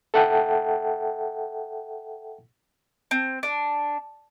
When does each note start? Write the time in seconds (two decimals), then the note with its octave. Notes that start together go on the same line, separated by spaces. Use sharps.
0.14 A4 E5 F#5 G5 A5
3.11 C4
3.43 D4